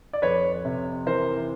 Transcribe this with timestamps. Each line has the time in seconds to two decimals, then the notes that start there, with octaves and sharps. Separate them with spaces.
0.13 D5
0.22 F2 B4 C#5
0.65 C3
1.06 E3 A#4 C5